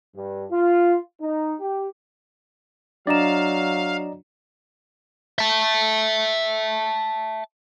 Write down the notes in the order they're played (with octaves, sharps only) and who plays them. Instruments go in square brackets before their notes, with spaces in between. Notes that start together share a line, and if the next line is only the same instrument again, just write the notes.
[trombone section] G2
F4
D#4
G4
[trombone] F#3 [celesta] D4 E7 [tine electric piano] D5 D#5 A#5 [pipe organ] F5
[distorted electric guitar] E5 A5